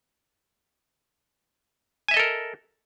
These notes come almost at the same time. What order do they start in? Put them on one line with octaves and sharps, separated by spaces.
G#5 E5 D#5 A4 A#4